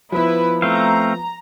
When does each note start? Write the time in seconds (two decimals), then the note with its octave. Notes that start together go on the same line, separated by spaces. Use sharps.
0.12 F3 B3 E4 B4
0.62 A3 C4 F5 A#5